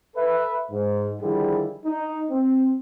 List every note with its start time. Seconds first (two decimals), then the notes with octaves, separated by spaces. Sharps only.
0.16 A4 B4 E5
0.71 G#2
1.21 D3 D#3 F3 G3 E4 G#4
1.85 D#4
2.30 C4